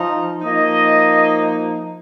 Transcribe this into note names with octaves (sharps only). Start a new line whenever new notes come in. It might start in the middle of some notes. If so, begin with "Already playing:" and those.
Already playing: F3 D#4
F3 A#3 D#4 D#5